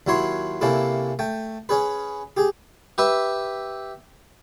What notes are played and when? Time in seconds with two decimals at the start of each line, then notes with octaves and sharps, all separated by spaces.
0.07 D#2 F#3 E4 C#5 C6
0.61 C3 A#3 C#4 E4 A4
1.19 A3 G5
1.69 C#4 G#4 B4
2.37 G4 G#4
2.98 G4 B4 E5